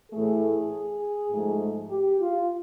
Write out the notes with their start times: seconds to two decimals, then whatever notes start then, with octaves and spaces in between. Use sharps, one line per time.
0.12 A2 E3 A3 G#4
1.30 G#2 F3 A3
1.90 G4
2.20 F4